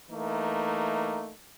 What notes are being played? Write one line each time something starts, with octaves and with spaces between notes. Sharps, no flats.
E3 A3 A#3 D#4